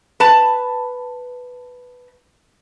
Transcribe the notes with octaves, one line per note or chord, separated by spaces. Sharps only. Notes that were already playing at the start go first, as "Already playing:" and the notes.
B4 A5